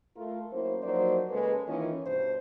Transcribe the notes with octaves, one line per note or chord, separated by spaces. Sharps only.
A3 F4 A#4
F#3 A#3 C#4 E4 C5
F3 F#3 A#3 D#4 C5 D5
C#3 G#3 A#3 A4 B4
D#3 E3 A#3 C#4 F4 D#5
G2 B2 C5 C#5